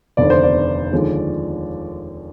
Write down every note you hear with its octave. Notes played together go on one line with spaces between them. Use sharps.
F1 D#2 D3 D5
C5
D5
D#2 D3 F3 G#3